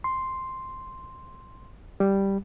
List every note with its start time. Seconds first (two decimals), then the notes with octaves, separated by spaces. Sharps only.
0.04 C6
2.00 G3